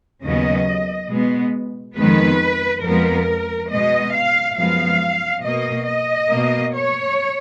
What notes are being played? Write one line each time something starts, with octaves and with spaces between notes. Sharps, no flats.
D#2 C#3 F#3 B3 D#5
B2 G#3 B3
F2 D#3 G#3 B3 B4
F2 F3 G#3 B3 A#4
B2 G#3 B3 D#5
F5
F#2 F3 G#3 B3 F5
B2 A#3 D#5
D#5
B2 A#3
C#5